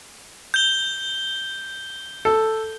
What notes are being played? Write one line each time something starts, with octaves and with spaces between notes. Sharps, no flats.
G6 G7
A4